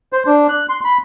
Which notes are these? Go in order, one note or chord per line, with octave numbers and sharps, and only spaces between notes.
C5
D4
F#6
C6
B5